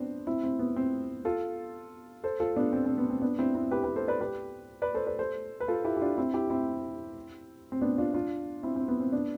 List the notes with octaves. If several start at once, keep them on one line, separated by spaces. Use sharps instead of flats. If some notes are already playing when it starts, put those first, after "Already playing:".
Already playing: B3 C4 D4
C4 E4
C4
B3
C4
F4 A4
A4 C5
F4 A4
B3 D4
C4
C4
B3
C4
B3 D4
C4 E4
C4 E4
G4 B4
G4 B4
A4 C5
B4 D5
G4 B4
B4 D5
A4 C5
B4 D5
A4 C5
B4
F4 A4
E4 G4
G4
D4 F4
C4 E4
E4 G4
C4 E4
C4
B3 D4
D4 F4
D4 F4
C4 E4
C4
B3
C4
B3 D4